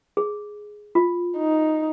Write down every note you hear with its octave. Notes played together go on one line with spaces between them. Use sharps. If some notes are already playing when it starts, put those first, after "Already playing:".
G#4
F4
D#4